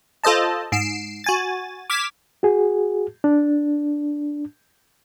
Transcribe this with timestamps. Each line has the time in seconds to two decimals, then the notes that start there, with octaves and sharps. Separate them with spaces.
0.24 F4 A4 C5 D#5 A5
0.72 G#2 C7 D7 E7
1.24 F#4 G#5 A6
1.90 D6 F6 G#6 B6 E7
2.43 F#4 G#4
3.24 D4